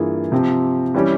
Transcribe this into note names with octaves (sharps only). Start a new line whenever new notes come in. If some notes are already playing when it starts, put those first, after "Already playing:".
Already playing: G2 E3 A#3 F4 G#4
C3 F3 C4 G4
E3 G3 C#4 G4